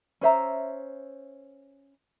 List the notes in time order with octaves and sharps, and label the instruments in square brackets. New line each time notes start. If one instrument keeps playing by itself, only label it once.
[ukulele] C#4 C5 E5 A#5